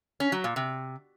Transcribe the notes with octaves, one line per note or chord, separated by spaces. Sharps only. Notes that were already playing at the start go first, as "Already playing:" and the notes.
C#4
F#3
A#2
C3